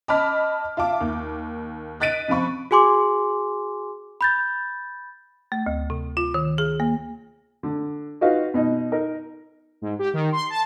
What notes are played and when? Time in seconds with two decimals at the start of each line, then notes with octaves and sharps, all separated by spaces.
0.08 D#5 A5 B5 D6 F6 B6
0.77 F4 E5 A5 D6
1.01 D#2
2.00 D#5 F#6 A6 B6 D7 D#7
2.28 C3 F3 C4 B5 C#6
2.71 F#4 G#4 G#5 C6 D6
4.21 B5 G6 A6
5.52 A3
5.66 D2
5.90 C3
6.17 F4
6.34 D#3
6.58 G#4
6.80 A#3
7.63 D3
8.21 D#4 F4 F#4 B4 F5
8.54 B2 D#4 D#5
8.92 D#4 A#4
9.82 G#2
9.99 G4
10.14 D#3
10.32 C6
10.50 A5